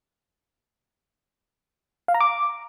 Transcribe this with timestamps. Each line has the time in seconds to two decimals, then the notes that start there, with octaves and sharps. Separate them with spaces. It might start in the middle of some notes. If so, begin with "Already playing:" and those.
2.08 F5
2.14 A#5
2.21 D6